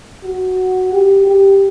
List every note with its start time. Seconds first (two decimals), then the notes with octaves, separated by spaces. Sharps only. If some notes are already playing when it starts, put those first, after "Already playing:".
0.23 F#4
0.92 G4
1.26 G4